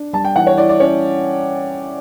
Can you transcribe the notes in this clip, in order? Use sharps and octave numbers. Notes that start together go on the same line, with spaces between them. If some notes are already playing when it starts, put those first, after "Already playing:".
Already playing: D4
G3 A5
G5
E3 F#5
C#5
E4 D5
D5
C#4 C#5